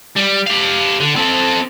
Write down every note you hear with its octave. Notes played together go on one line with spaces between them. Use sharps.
G3
G4 F5
D3
C4 A4